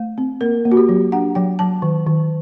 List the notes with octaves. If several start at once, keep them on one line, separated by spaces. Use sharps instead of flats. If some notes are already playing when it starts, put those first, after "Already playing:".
Already playing: A3
C4
A#3 A#4
A#3
F#4
G4
F#3
D4 F#5
F#3 G5
F#3 A5
D#3
D#3